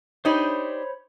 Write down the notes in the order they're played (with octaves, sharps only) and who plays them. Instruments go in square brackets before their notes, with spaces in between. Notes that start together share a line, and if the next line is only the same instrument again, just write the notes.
[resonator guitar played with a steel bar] D4 D#4 G4 [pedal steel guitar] C5 C#5 B5